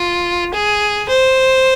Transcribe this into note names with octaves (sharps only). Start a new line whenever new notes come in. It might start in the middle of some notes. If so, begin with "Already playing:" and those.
Already playing: F4
G#4
C5